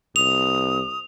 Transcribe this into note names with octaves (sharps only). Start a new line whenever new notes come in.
C2 D#6 F7